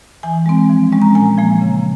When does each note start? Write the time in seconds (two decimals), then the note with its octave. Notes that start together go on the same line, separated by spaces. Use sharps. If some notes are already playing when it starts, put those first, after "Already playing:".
0.23 E3 G#5
0.46 G#3 C4
0.69 F3
0.92 G#3 C#4
1.02 A#5
1.15 A#2 G#5
1.38 F3 A#3
1.61 C#3